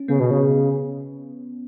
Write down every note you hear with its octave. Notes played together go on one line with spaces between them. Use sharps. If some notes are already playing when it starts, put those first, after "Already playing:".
Already playing: C#4
C#3 B3
B2
C#3